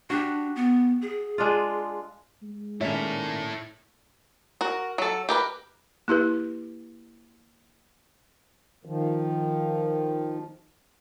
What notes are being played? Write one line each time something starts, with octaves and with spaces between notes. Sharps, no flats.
D4 F#4 G4
B3
G#4
G#3 D4 F4
G#3
A#2 D#3 C#4 E4 A4 C#5 E5
F#4 A#4
F#3 A4
G4 A#4 B4
A#3 E4 G4 B4
D#3 F3